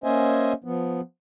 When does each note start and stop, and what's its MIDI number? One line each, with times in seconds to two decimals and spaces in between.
0.04 0.53 58
0.04 0.53 61
0.04 0.53 72
0.04 0.53 75
0.04 0.53 76
0.04 0.53 80
0.64 1.01 53
0.64 1.01 59